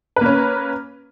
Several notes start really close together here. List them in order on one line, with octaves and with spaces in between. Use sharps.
B4 A#3 C#4